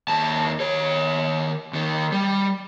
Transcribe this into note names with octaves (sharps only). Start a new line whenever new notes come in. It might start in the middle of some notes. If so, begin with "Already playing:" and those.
D#2 A5
D#3 C#5
D#2 D#3
G3